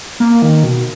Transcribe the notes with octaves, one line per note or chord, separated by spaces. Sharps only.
A#3
D#3
B2